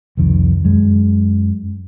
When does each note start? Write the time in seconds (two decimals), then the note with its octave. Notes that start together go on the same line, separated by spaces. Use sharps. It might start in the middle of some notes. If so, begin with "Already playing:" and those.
0.17 C2 F2 D#3
0.64 F#2 G#3